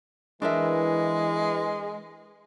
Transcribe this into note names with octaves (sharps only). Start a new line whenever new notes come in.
E3 G#3 D4 A#4 E5